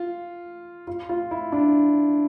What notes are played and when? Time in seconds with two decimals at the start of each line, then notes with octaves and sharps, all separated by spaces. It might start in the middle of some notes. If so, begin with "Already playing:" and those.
Already playing: F4
0.87 F4
1.09 F4
1.31 E4
1.52 D4